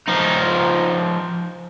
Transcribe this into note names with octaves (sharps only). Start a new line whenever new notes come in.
F3 D#4